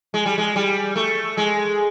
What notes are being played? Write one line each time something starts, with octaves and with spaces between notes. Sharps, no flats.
G#3
G3
G#3
G3
A3
G#3